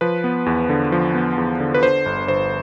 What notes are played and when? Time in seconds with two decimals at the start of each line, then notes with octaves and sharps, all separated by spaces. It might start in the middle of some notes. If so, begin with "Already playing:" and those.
0.01 F3 B4
0.24 B3
0.46 E2
0.69 D3
0.92 F3
1.14 B3
1.38 E2
1.60 D3
1.74 B4
1.82 D3 C5
2.06 G1
2.28 G1 C5